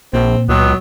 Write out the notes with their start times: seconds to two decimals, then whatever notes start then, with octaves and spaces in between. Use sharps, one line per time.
0.13 A#1 A#2 C4
0.49 C#2 F#3 B3